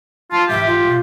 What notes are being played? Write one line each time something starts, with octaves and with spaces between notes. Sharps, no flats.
D4 F4 A5
G#2 E3 G4 E5
F4
F#2 B2